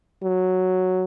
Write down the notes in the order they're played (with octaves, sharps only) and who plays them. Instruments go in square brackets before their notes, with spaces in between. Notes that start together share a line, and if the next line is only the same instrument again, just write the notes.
[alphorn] F#3